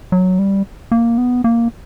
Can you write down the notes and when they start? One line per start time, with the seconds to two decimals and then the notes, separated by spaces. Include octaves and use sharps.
0.12 F#3
0.39 G3
0.92 A#3
1.18 B3
1.44 A#3